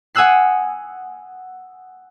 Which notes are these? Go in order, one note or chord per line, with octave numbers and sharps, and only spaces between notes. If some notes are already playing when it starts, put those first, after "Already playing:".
F#5 G#5 D#6 E6 F#6 C7